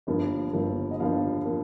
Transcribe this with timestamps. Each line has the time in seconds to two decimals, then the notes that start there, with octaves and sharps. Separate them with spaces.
0.07 G1 G2 F3 A#3
0.53 G1 G2 F3 A#3
0.91 D#5
1.00 G1 G2 F3 A#3 F5
1.45 F3 A#3